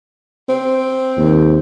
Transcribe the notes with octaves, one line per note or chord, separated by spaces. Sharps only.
C4
D#2